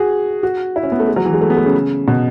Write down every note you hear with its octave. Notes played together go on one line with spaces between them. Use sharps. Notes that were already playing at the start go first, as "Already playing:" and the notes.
Already playing: F#4 G#4
F#4
E4
C#4
B3
A3
G#3
F#3
E3
G#3
A3
B3
A3
C#3
B2